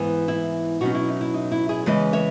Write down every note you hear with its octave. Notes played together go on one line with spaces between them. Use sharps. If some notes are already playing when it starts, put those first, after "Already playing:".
Already playing: G#2 E3 B3
E4
B2 F#3 C#4 D#4 F#4
E4
D#4
E4
D#4
E4
E4 G#4
E2 C#3 E3 G#3 B4 D#5
C#5 E5